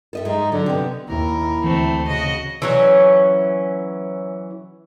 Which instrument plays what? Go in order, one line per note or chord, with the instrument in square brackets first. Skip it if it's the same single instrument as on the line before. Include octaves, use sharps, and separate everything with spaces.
[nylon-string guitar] A4 D#5 E5
[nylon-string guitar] G#2 G#3 [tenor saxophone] D#4
[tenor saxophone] D3 [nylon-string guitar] F#3
[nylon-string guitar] C3 B3
[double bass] D#2 [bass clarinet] E4 [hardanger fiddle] A#4
[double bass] D2 [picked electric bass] E3 [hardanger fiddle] A3 C4
[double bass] C#3 [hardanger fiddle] F#4 D#5
[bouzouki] E3 F#3 C#4